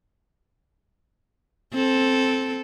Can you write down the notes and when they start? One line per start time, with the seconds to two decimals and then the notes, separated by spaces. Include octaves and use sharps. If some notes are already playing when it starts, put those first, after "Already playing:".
1.73 C4 A4